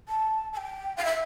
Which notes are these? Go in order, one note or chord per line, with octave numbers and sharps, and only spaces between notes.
A5
A5
G5
F5
E5